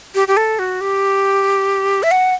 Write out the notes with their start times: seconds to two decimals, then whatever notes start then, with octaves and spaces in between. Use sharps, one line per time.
0.15 G4
0.28 G4
0.37 A4
0.59 F#4
0.81 G4
2.03 E5
2.11 F#5